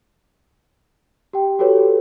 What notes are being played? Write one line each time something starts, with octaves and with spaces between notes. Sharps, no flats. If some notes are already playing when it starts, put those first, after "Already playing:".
G4 G5
F#4 G4 A4 B4 C#5